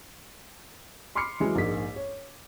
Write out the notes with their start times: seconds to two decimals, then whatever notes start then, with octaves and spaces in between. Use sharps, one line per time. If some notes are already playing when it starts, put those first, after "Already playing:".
1.15 B5 C6 D6 F6 C7 C#7
1.40 E3 F#3 G#3
1.55 A#1 G#2 A#3 G#4 B6
1.96 C#5